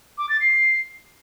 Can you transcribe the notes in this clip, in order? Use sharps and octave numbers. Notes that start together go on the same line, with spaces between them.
D6
A6
C7